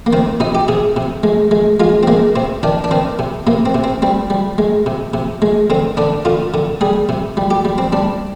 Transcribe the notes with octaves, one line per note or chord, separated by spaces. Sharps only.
A#3
D#3 C4
C3 D#4
G4
C3 G#4
C3
G#3
G#3
G#3 F4
C4
G#3 A#3
C3 C4
D#3 D4
D4
D#3 C4
C3
C3 A#3
C4
C3
C4
G3 C4
G3
G#3
C3
C3
G#3
D3 C4
D3 D4
D3 F4
D3
G3 G#4
C3
G3
G4
G3
C4
G3 D4